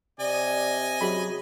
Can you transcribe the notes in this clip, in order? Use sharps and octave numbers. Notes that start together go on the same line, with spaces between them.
C3 D5 D#5 G#5
F#3 F#4 G#4 B5